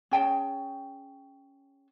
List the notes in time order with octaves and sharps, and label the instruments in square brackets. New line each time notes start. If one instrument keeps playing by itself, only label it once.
[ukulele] C#4 G#4 G5 A5